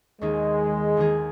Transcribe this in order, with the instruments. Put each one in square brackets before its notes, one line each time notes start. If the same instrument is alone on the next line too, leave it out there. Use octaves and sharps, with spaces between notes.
[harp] D#2 D#3 A#3 D#4 G#4 [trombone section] G#3
[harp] D#2 D#3 A#3 D#4 G#4